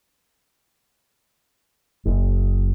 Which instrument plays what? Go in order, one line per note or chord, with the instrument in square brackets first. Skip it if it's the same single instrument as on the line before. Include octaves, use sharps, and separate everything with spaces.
[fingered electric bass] F#1